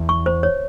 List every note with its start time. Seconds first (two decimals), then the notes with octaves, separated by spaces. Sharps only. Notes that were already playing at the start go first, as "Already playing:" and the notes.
Already playing: E2
0.09 C#6
0.26 C5
0.43 C#5